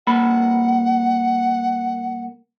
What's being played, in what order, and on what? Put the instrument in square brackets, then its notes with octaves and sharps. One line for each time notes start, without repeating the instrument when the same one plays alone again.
[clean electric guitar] C2 A#3 B5 [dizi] F#5